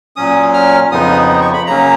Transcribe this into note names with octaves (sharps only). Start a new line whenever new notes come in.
A#2 F#3 C#4 D#6
F6
F2 C#3 F3 B3 D#4 D#6
C#6
B5
C#3 F#3 A#3 C#4 A#5